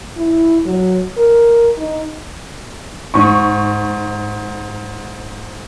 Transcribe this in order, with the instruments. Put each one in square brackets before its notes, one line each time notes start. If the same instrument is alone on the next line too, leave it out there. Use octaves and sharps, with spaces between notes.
[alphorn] E4
F#3
A#4
D#4
[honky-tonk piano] G#2 C#6